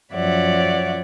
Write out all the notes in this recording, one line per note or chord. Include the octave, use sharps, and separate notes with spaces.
F#2 F3 C#5 D5 E5 F#5